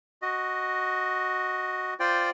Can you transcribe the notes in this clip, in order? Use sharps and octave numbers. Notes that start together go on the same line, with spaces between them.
F#4 D#5
F4 C5 D5 G5